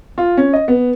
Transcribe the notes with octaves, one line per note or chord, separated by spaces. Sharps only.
F4
C#4
D#5
B3